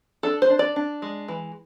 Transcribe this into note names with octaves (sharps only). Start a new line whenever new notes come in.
D4 A4
C5
D4
D5
D4
G#3
E3